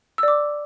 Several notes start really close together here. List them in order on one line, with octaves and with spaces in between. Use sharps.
E6 D5 D6